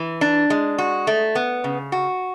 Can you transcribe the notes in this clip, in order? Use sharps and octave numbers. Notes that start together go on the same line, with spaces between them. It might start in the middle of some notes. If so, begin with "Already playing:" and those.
Already playing: E3
D4
G#3
F#4
A3
B3
C#3
F#4